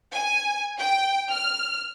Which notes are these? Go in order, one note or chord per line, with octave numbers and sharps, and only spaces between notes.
G#5
G5
F6